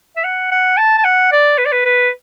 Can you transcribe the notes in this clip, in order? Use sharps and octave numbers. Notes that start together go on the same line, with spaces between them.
E5
F#5
F#5
A5
A5
F#5
D5
B4
D5
B4
B4